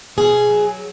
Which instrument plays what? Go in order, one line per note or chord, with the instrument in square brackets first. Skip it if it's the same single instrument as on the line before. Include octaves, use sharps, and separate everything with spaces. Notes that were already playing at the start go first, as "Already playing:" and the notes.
[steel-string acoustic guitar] B2 G#4
F#3